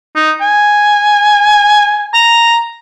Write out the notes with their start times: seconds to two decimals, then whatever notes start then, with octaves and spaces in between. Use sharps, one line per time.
0.16 D#4
0.41 G#5
2.14 A#5